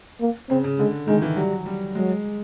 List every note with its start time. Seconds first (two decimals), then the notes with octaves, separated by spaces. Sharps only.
0.21 A#3
0.50 C#3 C4
0.64 C#3
0.78 D3 G#3
1.07 D#3 G#3
1.22 E3
1.36 F#3 G3
1.66 G3
1.95 F#3 G#3